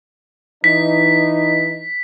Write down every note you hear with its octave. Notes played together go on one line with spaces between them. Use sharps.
E3 D#4 B6